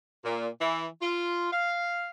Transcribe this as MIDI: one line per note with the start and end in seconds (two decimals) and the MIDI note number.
0.25 0.47 46
0.61 0.85 52
1.01 1.48 65
1.52 2.09 77